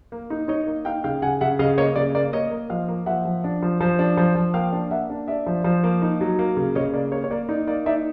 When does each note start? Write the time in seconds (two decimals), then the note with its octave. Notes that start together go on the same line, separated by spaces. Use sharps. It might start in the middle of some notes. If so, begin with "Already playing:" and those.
0.12 A#3
0.30 D#4
0.48 D#4 C#5 D#5
0.67 A#3
0.85 D#4 F5 G5
1.04 C#3 F5 G5
1.22 C#3 F#5 G#5
1.41 C#3 E5 F#5
1.59 C#3 D#5 F5
1.78 A#3 C#5 D#5
1.96 C#3 D5
2.15 A#3 D5
2.33 A#3 C#5 D#5
2.51 A#3
2.69 F3 D#5 F5
2.88 A#3
3.06 F3 E5 F#5
3.25 F3
3.44 D4
3.62 F3
3.81 F3
3.99 D4
4.17 F3
4.35 F3
4.54 A#3 F5 G5
4.72 D4
4.91 A#3 E5 F#5
5.10 D4
5.28 D4 D5 E5
5.47 F3
5.64 F3
5.84 A#3
6.02 D#4
6.21 F#3
6.39 A#3
6.57 C#3
6.75 C#3 C#5 D#5
6.94 A#3 D5
7.12 A#3 C#5
7.24 C#5
7.31 A#3 D5
7.49 D#4 D5
7.67 A#3 D5
7.86 D#4 D5 E5